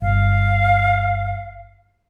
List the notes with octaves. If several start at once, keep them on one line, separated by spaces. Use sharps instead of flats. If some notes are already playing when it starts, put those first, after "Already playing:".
G1 F5